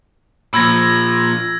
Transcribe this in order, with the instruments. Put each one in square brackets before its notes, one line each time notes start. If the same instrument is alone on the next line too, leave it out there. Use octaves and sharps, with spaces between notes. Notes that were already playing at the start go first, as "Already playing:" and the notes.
[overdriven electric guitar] A#2 F3 [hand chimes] B5 [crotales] E6 G#6 A#6